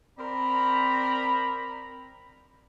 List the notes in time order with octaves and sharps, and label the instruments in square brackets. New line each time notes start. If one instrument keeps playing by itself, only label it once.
[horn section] C4 A#4 D5 A#5 B5